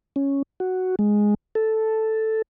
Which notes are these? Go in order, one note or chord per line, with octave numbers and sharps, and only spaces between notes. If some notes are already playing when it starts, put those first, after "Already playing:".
C#4
F#4
G#3
A4